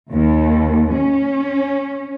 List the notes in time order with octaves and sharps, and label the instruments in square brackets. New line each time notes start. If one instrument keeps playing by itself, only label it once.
[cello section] D#2
C#4